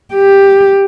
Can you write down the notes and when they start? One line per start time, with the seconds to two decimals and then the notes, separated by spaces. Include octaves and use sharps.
0.14 G4